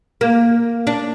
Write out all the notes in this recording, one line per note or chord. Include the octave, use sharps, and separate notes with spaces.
A#3
D4